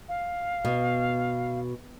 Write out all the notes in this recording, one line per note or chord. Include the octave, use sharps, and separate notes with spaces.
F5
B2